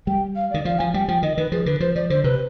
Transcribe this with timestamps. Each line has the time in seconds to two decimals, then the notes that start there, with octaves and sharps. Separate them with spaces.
0.07 G3 G5
0.36 F5
0.51 D#3 D5
0.65 F3 F5
0.79 F3 G#5
0.94 G3 G5
1.08 F3 G5
1.23 D#3 D#5
1.37 D#3 B4
1.52 F3 G#4
1.66 D3 B4
1.80 F3 C5
1.95 F3 D5
2.10 D3 C5
2.24 C3 B4